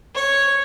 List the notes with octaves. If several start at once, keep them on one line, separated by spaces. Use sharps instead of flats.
C#5